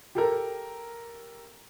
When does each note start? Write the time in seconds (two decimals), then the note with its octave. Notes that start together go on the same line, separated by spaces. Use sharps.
0.15 G4 A4 A#4